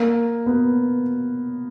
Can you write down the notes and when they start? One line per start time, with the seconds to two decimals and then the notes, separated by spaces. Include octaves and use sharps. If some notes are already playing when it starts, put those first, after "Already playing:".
Already playing: A#3
0.46 B3